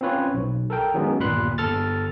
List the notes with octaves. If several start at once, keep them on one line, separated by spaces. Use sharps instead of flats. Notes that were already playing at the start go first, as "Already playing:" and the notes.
C4 C#4 F4 B4 C#5
B1
A4 A#4 G5
D#3 F#3 G#3 B3 C#4
G1 D#2 A#2 B5 C6 F#6
G1 A4 F6 A6